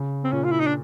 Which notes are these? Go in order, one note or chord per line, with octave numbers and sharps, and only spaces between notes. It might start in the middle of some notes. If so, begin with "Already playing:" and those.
Already playing: C#3
C4
A#2 C#4
F4
E4
D#4
D4